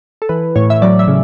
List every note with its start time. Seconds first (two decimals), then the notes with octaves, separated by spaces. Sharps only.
0.22 A4
0.29 E3 B4
0.56 A2 C#5
0.70 E5
0.82 F#3 D5
0.99 E5
1.08 C#3